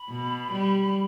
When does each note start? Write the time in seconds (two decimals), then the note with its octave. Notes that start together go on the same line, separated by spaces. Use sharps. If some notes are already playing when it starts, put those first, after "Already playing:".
Already playing: B5
0.09 B2
0.52 G3